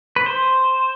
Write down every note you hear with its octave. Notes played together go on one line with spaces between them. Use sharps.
B4
C5